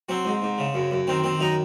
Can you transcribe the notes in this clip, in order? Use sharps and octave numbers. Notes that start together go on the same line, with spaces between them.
F#3 C4
G#2
G#2
C#3
F#2
F#2
D#3 C4
D#3 C4
F#2 D#4